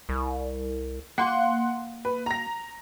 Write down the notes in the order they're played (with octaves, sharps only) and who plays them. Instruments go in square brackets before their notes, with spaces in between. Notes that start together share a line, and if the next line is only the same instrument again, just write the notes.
[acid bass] C2
[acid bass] A#3 [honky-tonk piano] F#5 C6
[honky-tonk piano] B4
A#5 A#6